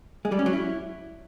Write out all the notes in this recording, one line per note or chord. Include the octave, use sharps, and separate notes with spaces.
G#3
G3
C#4
F#3
E4